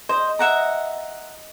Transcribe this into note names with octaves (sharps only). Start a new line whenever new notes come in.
C5 D#5
E5 F#5 A#5